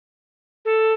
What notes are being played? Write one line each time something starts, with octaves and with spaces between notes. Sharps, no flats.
A4